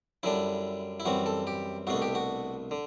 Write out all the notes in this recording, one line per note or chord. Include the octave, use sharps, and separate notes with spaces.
F#2 D3 G3 D4 E4
E4
F#2 E3 G3 C4 F#4
A4
G4
C2 B2 A3 D4 F#4
G4
F#4
D3